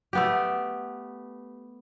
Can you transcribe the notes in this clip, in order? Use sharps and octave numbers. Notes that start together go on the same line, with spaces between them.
A3 B3 G4